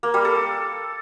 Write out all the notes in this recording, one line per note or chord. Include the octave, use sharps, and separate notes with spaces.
A#3
G3
A4